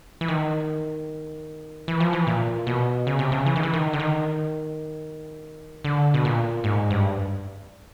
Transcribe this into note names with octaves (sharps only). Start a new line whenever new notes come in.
E3
D#3
E3
F3
E3
A#2
B2
C#3
C3
C#3
E3
D#3
E3
D#3
D3
D#3
D3
B2
A#2
G#2
G2